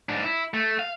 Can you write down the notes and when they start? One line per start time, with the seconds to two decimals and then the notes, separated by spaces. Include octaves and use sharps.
0.09 G#2 D4
0.23 E4
0.54 A3
0.79 F5